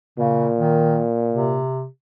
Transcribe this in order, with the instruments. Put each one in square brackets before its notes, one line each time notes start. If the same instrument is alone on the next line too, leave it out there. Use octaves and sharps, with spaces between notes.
[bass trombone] A#2 [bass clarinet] C#3
[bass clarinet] D#3
C3